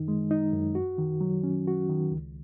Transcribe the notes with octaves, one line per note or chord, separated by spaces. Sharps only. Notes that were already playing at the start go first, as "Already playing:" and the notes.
Already playing: F#2 D#3 D#4
G#3
D#4
F#2
F#4
D#3
F#3
C#4
F#4
D#3
C#2